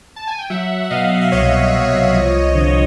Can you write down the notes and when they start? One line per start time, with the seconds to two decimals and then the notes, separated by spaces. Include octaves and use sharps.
0.16 A5
0.27 G#5
0.39 G5
0.50 F#3 E5 F#5
0.84 F#5
0.90 B2 D#5 F5
1.21 E5
1.32 C2 C#5 D#5
1.73 C2
2.14 F3
2.55 D3